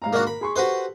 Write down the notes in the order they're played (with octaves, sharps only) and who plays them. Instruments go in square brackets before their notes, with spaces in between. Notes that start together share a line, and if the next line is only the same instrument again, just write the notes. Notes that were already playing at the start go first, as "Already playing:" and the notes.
[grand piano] G#2 F5 A#5
[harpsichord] A#3 D4 F#4
[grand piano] A#4 [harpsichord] B5
[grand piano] G#4 C6 C#6
[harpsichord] F#4 B4 C5 [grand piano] G4 A4